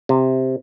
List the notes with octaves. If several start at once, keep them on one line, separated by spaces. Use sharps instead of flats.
C3